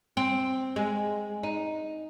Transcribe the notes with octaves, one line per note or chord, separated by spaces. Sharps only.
C4
G#3
D#4